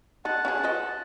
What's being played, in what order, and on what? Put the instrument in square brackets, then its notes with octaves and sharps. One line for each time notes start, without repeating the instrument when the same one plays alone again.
[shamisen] D#4 D#5 [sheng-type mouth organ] F#5 A5
[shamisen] C#4 F4 G#4
F4 B4 D#5